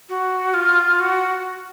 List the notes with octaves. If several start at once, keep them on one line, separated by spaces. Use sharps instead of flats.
F#4
F4
F#4